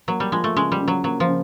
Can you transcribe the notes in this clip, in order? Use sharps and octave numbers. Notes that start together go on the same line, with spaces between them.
F#3 A#3
G3
F3 G#3
A3
C#3 G#3
G3
C#3
F#3
F#3 A#3
F3
C#3